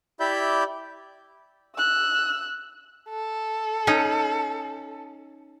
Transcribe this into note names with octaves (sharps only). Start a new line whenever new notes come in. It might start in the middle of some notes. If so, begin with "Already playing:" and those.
E4 G4 D5 E5 B5 G6
E6 F#6
A4
C#4 D#4